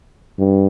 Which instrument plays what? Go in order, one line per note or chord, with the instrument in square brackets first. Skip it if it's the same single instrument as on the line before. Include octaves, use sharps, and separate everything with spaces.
[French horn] G2